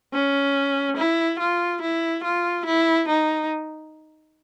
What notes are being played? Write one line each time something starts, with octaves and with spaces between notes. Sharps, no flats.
C#4
E4
F4
E4
F4
E4
D#4